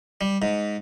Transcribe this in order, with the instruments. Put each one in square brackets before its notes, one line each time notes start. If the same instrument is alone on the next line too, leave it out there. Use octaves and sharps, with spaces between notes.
[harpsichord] G3
G#2